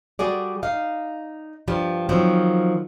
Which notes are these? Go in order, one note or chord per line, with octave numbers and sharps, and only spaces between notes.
G3 F#4 G#4 D5
D#4 F5
G2 F3 G3
D#3 F3 F#3 C4